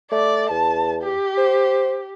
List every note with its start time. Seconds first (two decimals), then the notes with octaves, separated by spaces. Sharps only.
0.12 A3 D5
0.50 E2 A5
1.03 G4
1.38 C5